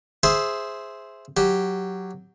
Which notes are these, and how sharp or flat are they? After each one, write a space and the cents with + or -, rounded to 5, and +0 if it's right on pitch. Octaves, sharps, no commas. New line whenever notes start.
G#4 +0 C5 +0 E5 +0
F#3 +0 G4 +0